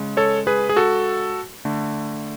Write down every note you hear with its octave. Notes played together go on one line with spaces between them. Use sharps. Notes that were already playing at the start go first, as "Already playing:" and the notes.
Already playing: C#3 G#3
A4 C#5
G#4 B4
G#4
F#4 A4
D3 A3